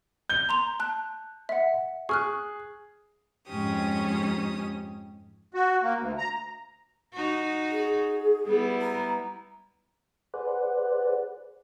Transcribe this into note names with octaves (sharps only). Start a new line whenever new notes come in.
G6 G7
A#5 C6 F7
A5 F#6
E5 F#5
G#4 C#6 F6 F#6
F2 G#2 C#4 G4 D#6
F#4
A#3
D2
A#5
D#4 F#4
G#4
G3 B3 E4
A#5
G#4 B4 C5 D5 F#5